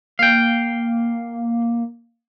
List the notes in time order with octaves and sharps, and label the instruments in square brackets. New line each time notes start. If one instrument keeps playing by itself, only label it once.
[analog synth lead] A#3 [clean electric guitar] F5 G5